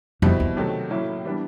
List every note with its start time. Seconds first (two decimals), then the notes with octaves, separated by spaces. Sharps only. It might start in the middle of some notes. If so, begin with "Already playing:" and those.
0.22 F2 B2 G3 C4 E4
0.40 E2
0.56 C3 D#3 F#3 A3
0.90 A2 F#3 A#3 C#4 E4
1.25 E3 G3 B3 D4